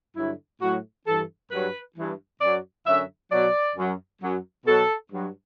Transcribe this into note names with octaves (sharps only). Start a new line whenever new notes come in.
G2 D3 F#3 E4
A2 F#3 F#4
G2 E3 A4
G2 F#3 B4
G2 E3
F#2 F#3 D5
F#2 D3 F#3 E5
B2 F#3 D5
F#2 F#3
F#2 F#3
B2 F#3 A4
G2 F#3